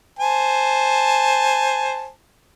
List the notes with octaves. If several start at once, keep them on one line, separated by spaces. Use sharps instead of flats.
C5 G#5 A5